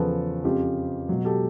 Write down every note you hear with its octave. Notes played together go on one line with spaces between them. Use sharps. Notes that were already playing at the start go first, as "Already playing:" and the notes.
Already playing: E2 C#3 F3 A4 B4
F2 C#3 F3 F4 G4
B2 F#3
G4 A4